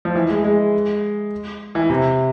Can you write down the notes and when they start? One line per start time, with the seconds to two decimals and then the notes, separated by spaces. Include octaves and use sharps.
0.05 F3
0.15 E3
0.30 G#3
0.44 G#3
1.75 E3
1.90 C3